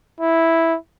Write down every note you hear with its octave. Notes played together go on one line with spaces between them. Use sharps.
E4